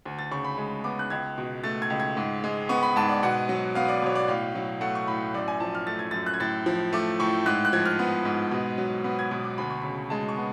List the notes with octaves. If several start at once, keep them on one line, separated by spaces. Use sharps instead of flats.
D2
A6
C#3 C#6
B5
G#3
B3 D6
F#6
C#2 G#6
B2
A3 A6
G#6
C#2
G#6
G#2
G#3
B3 C#6
B5
G#2 A5
D5
B2 F#5
F#3
B3 F5
D5
B2 C#5
D5
A2 F5
F#3
A3 F#5
C#6
A2 B5
F#2 D5
G#5
F3 A5
F6
A3 A6
G#6
F#2 A6
F#6
G#6
A2 A6
F3
A3 D6
A2 C#6
G#2 F#6
F#6
F3 G#6
F6
B3
G#2
B2
F#3
B3
G#6
B2
D6
D2 B5
C#6
C#3 B5
G#3 A5
C#6
B3